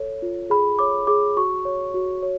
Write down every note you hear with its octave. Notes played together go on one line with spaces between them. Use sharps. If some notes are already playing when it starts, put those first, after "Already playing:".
Already playing: A4 C#5
F4
G#4 B5
C#5 D6
G#4 D6
F#4 C#6
C#5
F#4
C#5